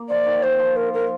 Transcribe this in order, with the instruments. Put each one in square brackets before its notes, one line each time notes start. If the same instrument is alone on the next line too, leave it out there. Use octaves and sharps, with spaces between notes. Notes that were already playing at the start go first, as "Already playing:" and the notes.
Already playing: [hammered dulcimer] A#3
[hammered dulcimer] F3 [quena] D5
[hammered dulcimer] D#3
[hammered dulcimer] D#3 [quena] C5
[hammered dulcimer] F3
[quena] A#4
A#4